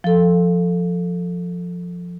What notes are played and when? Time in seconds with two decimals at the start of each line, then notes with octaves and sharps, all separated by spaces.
0.04 F3 A4